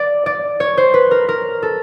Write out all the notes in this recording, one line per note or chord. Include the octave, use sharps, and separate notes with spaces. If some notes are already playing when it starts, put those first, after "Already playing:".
Already playing: D5
D5
C#5
C5
B4
A#4
A#4
A4